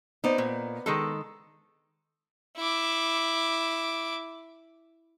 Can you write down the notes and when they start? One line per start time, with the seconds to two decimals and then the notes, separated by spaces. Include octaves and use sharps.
0.24 B3 D#4 C5 D5
0.38 A#2
0.86 D#3 G#3 A4
2.57 E4 D6